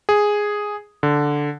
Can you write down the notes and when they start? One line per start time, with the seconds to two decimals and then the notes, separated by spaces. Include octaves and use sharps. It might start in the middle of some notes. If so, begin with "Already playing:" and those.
0.09 G#4
1.03 D3